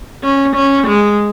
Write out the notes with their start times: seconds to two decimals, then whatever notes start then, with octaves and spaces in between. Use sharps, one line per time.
0.23 C#4
0.56 C#4
0.87 G#3